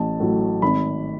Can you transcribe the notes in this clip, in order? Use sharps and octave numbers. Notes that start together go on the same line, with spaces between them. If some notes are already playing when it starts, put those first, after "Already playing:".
Already playing: A1 A5
A2 F#3
G#1 B5